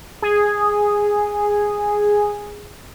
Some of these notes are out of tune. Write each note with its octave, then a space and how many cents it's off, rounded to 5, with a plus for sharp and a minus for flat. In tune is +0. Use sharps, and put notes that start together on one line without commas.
G#4 -5